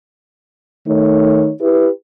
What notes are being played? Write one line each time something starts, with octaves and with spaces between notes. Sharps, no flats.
D#3 A3 D#4 C#5
E4 G4 B4